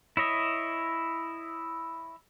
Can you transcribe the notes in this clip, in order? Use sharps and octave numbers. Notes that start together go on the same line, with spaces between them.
E4 C#5 D#5 E5